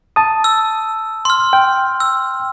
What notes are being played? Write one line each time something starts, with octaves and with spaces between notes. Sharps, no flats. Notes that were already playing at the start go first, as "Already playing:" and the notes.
A5 D#6
E6
C6 F6
G5
E6